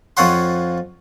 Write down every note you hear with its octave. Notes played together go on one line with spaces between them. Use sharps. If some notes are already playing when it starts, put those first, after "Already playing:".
F2 F3 C#5 F#5 C6